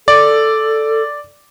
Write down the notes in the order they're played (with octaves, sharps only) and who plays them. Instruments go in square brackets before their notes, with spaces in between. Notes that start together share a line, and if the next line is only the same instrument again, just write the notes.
[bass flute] A4 [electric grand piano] D5